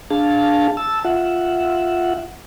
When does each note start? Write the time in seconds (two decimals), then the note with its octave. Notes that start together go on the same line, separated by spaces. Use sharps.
0.11 D4 G#4 F5 A5
0.77 A5 E6
1.04 F4 E5 F#5